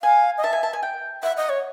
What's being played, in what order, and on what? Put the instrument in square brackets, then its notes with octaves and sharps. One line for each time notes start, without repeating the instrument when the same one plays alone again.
[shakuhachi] F5 [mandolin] G#5
[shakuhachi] D#5
[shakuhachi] E5 [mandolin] A5
[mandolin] G#5
A5
G#5
G5
[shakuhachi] E5 [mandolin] F#5
[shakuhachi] D#5
C#5